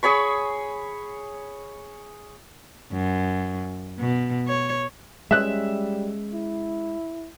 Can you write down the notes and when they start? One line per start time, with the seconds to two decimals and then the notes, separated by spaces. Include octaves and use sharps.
0.03 G#4 C#5 B5 C#6
2.93 F#2
4.00 B2
4.48 C#5
5.31 G3 G#3 C#4 E5 F#6
6.34 E4